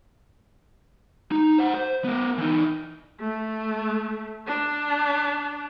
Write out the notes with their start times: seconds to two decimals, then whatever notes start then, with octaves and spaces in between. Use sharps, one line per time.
1.32 D#4
1.58 C5 F#5
1.75 C5
2.04 B3 A#4
2.38 E3 D#4
3.20 A3
4.47 D4